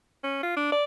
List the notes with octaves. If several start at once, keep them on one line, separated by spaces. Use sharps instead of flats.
C#4
F4
D4
D5